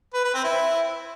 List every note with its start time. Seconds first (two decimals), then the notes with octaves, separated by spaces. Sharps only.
0.14 B4
0.24 B4
0.34 C4
0.44 E4